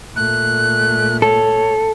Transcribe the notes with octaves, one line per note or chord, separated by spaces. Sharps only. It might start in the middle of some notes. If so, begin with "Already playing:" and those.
A#2 A3 F#6
A4 C#5